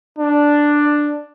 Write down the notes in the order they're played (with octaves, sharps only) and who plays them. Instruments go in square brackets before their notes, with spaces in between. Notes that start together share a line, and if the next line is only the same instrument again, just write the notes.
[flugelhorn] D4